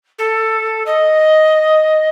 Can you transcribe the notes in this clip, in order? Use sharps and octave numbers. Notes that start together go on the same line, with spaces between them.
A4
D#5